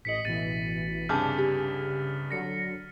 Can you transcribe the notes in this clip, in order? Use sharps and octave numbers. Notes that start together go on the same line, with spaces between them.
A1 D#5 B6 C#7 F#7
A1 B2 E3 A6 B6 D#7
C2 G2 C#3 G#4 A5 D6 F6 G6
G4
D3 F#3 A#6 C#7